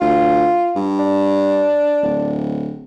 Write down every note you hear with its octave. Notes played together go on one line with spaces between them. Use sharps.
D2 F4
G2
D4
D1